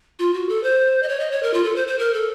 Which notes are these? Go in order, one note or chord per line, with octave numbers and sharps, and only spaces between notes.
F4
F#4
A4
C5
D#5
C#5
D#5
C#5
A#4
F4
A4
C5
C5
A#4
A4